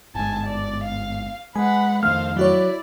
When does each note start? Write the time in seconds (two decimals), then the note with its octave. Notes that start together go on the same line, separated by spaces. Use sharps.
0.15 G1 G#2 G#5 A5
0.47 D5
0.84 F5
1.55 G#3 B4 F#5 G#5
2.03 F2 D#3 A3 C5 F5 F6
2.37 F#3 E4 F#4 C#5 D5